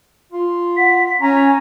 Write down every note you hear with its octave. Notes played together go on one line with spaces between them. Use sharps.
F4
F#5 B6
C#4 G#5 A#5